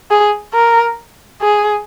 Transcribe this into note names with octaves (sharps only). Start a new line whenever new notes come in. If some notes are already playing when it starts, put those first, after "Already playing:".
G#4
A#4
G#4